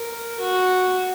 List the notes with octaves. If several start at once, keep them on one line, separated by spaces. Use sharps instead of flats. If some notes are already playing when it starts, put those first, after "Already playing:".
Already playing: A#4
F#4